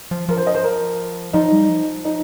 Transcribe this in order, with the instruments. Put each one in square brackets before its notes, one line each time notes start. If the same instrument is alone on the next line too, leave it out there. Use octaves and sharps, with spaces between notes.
[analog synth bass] F3
[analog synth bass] F3 [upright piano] A#4
[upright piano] C5
D#5
C5
A#4
[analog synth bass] F3 [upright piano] D#4
[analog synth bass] G3
F3
[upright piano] D#4